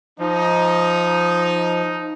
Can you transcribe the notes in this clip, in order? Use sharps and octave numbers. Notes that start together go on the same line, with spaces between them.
F3 D#4